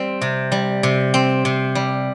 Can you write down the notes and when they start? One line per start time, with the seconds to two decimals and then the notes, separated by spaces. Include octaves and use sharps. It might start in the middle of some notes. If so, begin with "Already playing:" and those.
Already playing: G3 C4
0.22 C3
0.52 G3
0.83 C3
1.14 C4
1.45 C3
1.75 G3